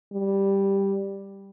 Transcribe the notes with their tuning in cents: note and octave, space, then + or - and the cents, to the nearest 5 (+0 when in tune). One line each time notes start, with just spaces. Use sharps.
G3 +5